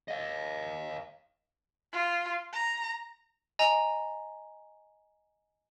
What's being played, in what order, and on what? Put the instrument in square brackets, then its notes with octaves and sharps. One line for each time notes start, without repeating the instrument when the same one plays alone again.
[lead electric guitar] D#5 F5
[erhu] F4
A#5
[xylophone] D#5 G#5 A#5